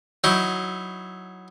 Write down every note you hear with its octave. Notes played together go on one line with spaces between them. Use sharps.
F#3 D#4 E4